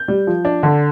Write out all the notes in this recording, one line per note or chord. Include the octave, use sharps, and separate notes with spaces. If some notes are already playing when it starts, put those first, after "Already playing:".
Already playing: G6
G3
F3
D4
D3